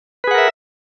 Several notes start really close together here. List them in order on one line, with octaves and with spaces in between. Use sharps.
B4 G#4 F#5 A#4 E5